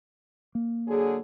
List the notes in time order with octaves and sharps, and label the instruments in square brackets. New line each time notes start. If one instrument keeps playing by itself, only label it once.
[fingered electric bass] A#3
[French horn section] D3 F#3 G#4